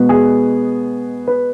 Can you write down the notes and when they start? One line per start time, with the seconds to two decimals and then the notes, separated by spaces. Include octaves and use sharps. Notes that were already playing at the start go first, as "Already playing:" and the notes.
Already playing: B2 G#3 B3
0.09 G#4
1.28 B4